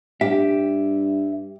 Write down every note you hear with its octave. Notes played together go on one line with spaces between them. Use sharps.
G2 G4 E5